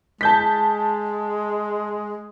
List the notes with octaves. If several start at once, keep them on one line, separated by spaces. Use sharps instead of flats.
G#3 A5 G6 B6